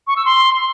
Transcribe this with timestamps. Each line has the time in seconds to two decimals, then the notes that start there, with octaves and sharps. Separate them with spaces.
0.07 C#6
0.16 E6
0.25 C6